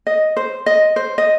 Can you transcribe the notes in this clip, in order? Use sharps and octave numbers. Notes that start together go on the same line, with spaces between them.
D#5
C5
D#5
C5
D#5